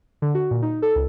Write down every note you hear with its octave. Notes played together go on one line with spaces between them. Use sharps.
D3
F#4
A#2
D#4
A4
C#2